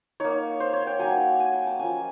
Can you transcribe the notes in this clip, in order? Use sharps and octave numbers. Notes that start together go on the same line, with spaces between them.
A#3 D#4 C#5
C5
C#5
G5
F#3 A#3 D#4 G#5
G#5
G5
A5
F3 A#3 C#4 G#5